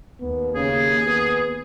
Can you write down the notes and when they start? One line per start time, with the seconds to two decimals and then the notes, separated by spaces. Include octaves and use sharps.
0.21 D#2 B3
0.55 C#3 G#4
1.06 B3